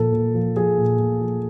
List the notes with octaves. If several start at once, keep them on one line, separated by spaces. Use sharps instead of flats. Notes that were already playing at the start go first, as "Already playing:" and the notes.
Already playing: A#2 F3 A4
A#2
F3
F3 G#4
A#2
A#2
F3